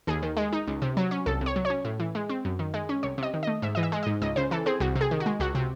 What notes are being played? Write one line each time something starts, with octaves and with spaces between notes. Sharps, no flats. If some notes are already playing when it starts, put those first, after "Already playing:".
D#2 G#4
D#3
G#3
D#4
C#2
C3
F#3
C#4
C2 A4
C3
C#5
F#3
C#5
C#4
A2
E3
G#3
C4
F#2
D#3
G#3
C#4
C2 C#5
C3 D#5
D#3
A3 D#5
G#2 E5
E3 D#5
E5
G#3
G#2 D#5
C#2 D#5
C#3 C5
E3 A4
C4 G#4
C2 F#4
C3
G#4
D#3
F#4
G#3
C#2 F#4
C3